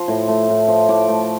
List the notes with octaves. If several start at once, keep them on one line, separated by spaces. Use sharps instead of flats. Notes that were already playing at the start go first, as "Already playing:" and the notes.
Already playing: F3 C6
A2
A3
A2
F3
A2 D6
A3